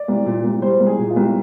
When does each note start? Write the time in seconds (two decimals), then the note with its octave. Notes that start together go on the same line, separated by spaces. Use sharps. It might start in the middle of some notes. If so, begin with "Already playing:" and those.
Already playing: D5
0.08 C2
0.26 A#2
0.44 C2
0.62 G3 C5
0.80 C2
0.86 G#4
0.99 A#2
1.10 F4
1.16 C2